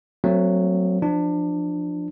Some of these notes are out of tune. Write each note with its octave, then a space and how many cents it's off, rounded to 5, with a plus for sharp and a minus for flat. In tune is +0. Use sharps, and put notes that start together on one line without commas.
F#3 +0 A3 +35 C4 +0
F3 +0 D4 +20